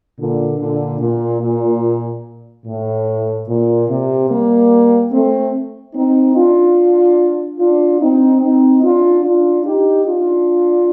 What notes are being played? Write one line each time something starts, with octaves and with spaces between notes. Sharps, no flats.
A#2 D3
A#2 D3
A#2
A#2
A2
A#2
C3
G3 A#3
A3 C4
C4 D#4
D4 F4
D4 F4
C4 D#4
C4 D#4
D4 F4
D4 F4
D#4 G4
D4 F4